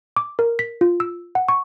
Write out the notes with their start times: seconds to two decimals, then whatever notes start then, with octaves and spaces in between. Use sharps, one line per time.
0.16 D6
0.39 A#4
0.59 B6
0.81 F4
1.00 E6
1.35 F#5
1.48 C#6